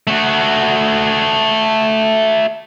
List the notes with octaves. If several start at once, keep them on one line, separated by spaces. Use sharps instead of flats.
A3 F#4